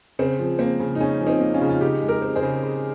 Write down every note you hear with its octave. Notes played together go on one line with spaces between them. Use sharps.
C#3 C4
F3
A#3 C4
C#3
D#4
C#3 C#4
F3
C4 D#4
A#3
C#4 F4
C#3
F4
C#3 D#4 G4
G#3
G4 A#4
C4
G#4 C5
C#3
C#3